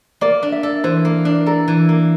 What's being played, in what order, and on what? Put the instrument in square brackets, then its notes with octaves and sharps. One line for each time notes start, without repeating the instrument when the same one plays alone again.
[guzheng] A#3 [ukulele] D5
[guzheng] D4
[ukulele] E5
[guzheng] A4
[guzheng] E3 [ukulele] C5
[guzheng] A#3
D4
[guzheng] A4 [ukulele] A#4
[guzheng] E3
A#3